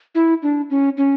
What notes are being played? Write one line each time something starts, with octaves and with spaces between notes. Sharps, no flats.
E4
D4
C#4
C#4